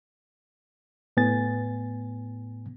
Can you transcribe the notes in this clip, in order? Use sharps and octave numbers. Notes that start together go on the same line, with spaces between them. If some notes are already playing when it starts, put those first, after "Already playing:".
A2 B3 G#5 A6